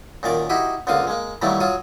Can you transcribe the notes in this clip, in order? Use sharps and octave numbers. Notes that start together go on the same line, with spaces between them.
F#2 A#2 D#3 D5 D6
D#4 E4 F#4 G4 D#5
C#2 D3 F3 A#3 F5 D#6
G#3 A#3
D#3 E3 F#3 G3 A3 A#3
F#3 F4 F#4 D#6